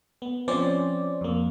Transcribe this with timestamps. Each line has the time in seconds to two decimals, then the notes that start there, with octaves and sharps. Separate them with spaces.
0.22 B3
0.48 F3 C4 C#4 C5 D5
1.21 F2 A#3